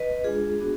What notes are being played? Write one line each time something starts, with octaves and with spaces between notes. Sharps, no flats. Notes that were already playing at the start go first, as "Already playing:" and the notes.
Already playing: B4 D#5
G#3 D4 F4 G#4
B3 D4 F#4